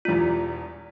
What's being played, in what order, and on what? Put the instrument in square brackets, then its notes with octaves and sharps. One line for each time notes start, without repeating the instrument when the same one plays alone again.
[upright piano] E1 E2 E3 G3 D4 [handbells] F4